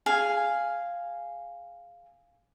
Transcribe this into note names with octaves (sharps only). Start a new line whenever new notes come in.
G#4 F5 G#5